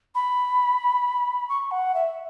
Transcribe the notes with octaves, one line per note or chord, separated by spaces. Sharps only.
B5
C#6
F#5
E5